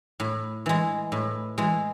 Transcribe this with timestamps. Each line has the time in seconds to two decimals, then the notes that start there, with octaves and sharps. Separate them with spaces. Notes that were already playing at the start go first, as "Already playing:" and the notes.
0.20 A2
0.66 E3 G#3
1.12 A2
1.58 E3 G#3